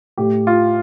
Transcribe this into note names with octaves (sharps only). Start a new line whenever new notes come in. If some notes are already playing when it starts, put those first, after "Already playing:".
A2 G4
F4